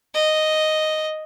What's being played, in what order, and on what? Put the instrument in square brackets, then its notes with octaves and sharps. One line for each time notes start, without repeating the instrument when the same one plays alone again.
[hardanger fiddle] D#5